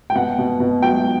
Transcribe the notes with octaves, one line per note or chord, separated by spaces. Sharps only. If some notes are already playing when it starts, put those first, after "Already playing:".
G5
B2 F#5
B2
B2
F#3 G5